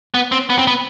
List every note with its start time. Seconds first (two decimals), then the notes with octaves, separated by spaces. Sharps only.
0.14 B3
0.32 C4
0.50 B3
0.59 C4
0.67 B3